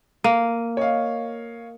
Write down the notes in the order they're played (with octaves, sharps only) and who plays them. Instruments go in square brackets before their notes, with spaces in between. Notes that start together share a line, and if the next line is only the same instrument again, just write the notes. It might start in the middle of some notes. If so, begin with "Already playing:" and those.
[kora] A#3 [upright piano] D#7
[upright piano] C#5 D#5 F5